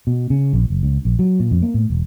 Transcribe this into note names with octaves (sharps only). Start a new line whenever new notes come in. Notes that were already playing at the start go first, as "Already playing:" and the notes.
B2
C#3
A#1
F#1
C#2
A#1
F#3
A#2
F2
A#3
A2
E1